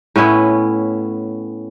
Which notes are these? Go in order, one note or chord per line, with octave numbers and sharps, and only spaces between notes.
A2 B3 C#4 E4